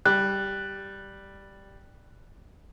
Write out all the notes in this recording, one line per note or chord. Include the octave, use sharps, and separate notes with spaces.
G3 F#6